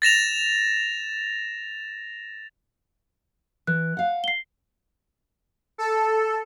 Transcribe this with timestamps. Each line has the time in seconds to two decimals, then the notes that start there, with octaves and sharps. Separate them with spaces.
0.02 A6 A#6 E7 F7
3.67 E3 F#6
3.97 F5 F#5
4.24 C7 G7
5.78 A4